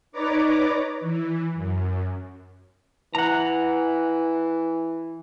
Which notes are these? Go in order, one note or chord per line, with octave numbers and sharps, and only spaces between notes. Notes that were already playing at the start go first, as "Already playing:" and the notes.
D#4 B4 C#5 D5 A#5 D6
E3
F#2
E3 F#5 A#5